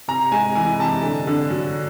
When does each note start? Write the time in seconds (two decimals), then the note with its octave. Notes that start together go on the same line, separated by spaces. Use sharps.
0.08 C3 A#5
0.32 G#3 G#5
0.55 E3 G#5
0.79 C3 A5
1.03 D3
1.27 D3
1.50 F#3